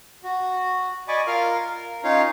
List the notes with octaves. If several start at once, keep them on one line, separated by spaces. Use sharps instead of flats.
F#4
D5 D#5 G#5 B5 C#6 D6
F4 A#4 F5 F6
A#4
C#4 D#4 F4 C#5 F5